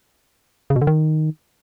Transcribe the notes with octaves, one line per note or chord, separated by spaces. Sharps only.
C#3
B2
D3
D#3